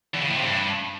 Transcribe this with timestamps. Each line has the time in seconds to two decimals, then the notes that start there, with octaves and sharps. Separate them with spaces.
0.14 E2
0.22 C#3
0.30 A2
0.38 C3
0.46 G2